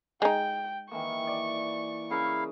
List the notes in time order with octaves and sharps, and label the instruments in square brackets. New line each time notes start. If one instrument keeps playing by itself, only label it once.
[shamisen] G#3 D#4 [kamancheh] G5
[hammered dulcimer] D#3 E3 A#3 [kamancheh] C#6
[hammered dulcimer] D5
[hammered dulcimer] C#3 A#4 [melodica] E4 F5